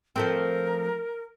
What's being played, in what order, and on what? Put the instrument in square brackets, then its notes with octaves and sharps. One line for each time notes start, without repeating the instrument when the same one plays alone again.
[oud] F3 A3 C4 [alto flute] A#4